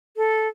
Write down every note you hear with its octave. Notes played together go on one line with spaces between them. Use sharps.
A4